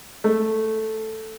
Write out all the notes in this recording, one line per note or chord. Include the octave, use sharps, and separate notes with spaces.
A3